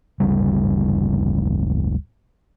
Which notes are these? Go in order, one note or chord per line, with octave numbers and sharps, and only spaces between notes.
D1 G1 C#3 G3